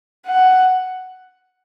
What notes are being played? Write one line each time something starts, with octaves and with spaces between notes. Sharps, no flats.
F#5